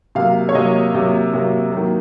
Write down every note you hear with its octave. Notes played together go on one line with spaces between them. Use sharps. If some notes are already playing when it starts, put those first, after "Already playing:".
C3 F#3 A#3 F5
C#5
C3 F#3 A#3 D#5
C3 F#3 A#3
C3 F#3 A#3
D#3 F#3 A#3